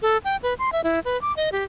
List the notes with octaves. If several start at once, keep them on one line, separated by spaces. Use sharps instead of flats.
A4
G5
B4
C6
E5
E4
B4
D6
D#5
G4